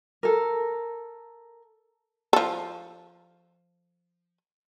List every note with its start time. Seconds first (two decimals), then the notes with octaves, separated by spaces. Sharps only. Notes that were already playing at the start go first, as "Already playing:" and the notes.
0.23 A4 A#4
2.33 F3 A4